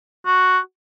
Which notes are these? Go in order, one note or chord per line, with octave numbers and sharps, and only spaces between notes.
F#4